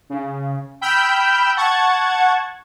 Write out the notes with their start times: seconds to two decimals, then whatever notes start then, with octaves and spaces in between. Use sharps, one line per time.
0.10 C#3
0.81 G5 B5 E6 F6 G6
1.56 F#5 A5 C#6 G#6